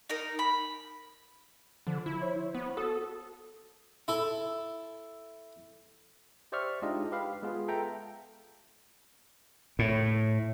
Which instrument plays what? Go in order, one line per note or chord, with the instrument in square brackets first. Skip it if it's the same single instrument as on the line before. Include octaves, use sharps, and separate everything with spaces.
[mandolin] D#4 A#4
B5
[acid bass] D3 [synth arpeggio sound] F3
[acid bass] E4
[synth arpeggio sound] C5 C#5
[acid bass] B3
[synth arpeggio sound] F#4 D#6 [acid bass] A4
[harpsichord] E4 A4
[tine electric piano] G4 C5 D5 E5 C#6 F6
G#3 D4 D#4 F4 G4 D#5
G4 B4 F5 B5
G#3 B3 F4 G#4
A4 E5 G5 A#5
[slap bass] A2